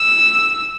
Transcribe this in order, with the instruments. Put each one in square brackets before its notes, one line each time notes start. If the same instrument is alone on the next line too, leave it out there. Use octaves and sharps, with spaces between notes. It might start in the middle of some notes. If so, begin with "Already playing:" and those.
Already playing: [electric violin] E6